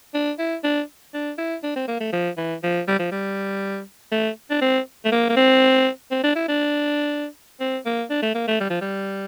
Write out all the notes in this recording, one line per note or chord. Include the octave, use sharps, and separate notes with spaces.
D4
E4
D4
D4
E4
D4
C4
A#3
A3
F3
E3
F3
G3
F3
G3
A3
D4
C4
A3
A#3
A#3
C4
C4
D4
E4
D4
C4
A#3
D4
A3
A#3
A3
G3
F3
G3